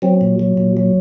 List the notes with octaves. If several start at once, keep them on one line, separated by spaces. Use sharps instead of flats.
F#3 C4
A#2
F#3
A#2
F#3